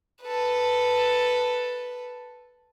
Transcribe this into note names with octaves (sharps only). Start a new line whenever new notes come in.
A4 B4